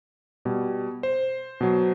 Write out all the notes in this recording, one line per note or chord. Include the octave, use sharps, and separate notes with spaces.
B2 G3
C5
B2 F#3